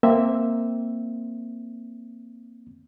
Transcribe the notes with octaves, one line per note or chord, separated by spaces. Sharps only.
A#3 C4 E5